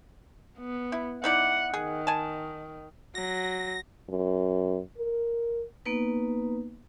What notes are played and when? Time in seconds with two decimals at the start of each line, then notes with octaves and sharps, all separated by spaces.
0.59 B3
0.92 E4
1.24 D#4 E4 D5 F#5
1.73 D#3 G#4
2.07 G#5 A5
3.15 F#3 A#6
4.09 F#2
4.98 A#4
5.86 A#3 B3 D#4 B4